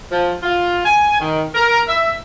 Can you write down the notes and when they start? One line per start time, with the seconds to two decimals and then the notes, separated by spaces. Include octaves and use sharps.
0.10 F3
0.43 F4
0.84 G#5
1.20 D#3
1.55 A#4
1.88 E5